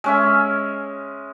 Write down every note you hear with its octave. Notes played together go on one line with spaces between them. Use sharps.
G#3 C#4 E5